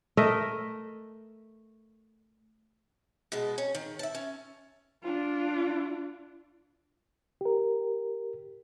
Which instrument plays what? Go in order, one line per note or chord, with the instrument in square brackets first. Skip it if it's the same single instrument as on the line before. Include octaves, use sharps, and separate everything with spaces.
[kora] A3 A#4 D#5 E5
[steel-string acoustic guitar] B2 G#3 A5
C#4
D#3
E5 A5
C#4
[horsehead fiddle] D4 F4
[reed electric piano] G4 A#4